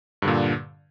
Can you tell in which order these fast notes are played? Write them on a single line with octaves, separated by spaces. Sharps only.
G2 D3 A#2